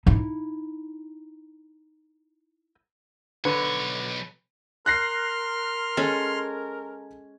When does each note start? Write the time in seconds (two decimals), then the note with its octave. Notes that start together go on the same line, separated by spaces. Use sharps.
0.06 D#4 E4
3.45 B1 D3 B4 C#5
4.86 A#4 C6 F6 F#6 A#6 C7
5.97 G#3 C#4 A4